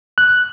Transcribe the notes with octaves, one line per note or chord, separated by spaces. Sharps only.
F#6